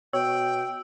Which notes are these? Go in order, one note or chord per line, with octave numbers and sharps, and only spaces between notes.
B2 C#5 G5 E6